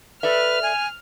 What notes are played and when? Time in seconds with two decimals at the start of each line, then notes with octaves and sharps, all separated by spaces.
0.23 A4 B4 D5 E5 F6
0.63 G#5